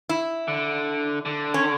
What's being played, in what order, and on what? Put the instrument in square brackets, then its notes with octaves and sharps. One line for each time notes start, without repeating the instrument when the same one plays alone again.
[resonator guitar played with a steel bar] E4
[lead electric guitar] D3
D3
[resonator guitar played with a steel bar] C#4